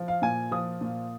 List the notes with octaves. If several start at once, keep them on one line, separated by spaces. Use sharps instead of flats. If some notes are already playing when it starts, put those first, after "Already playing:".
Already playing: F3
F5
A#2 G#5
F3 D#6
A#2